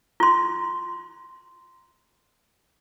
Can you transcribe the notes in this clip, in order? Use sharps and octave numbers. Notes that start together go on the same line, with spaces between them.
F4 C6